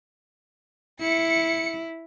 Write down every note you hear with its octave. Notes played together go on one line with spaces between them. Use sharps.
E4 C#7